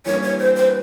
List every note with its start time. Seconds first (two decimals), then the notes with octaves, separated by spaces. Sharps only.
0.06 E3 G3 A#3 D4 C#5
0.22 C#5
0.39 C5
0.56 C5
0.67 B4